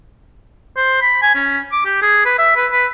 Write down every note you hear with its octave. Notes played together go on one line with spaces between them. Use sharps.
C5
B5
G#5
C#4
D6
G4
G#4
B4
E5
B4
B4